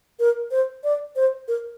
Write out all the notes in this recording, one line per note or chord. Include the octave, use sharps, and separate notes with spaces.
A#4
C5
D5
C5
A#4